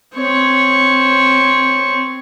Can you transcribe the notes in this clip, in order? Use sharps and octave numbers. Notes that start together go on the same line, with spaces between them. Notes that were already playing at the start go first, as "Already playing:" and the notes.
C4 C#5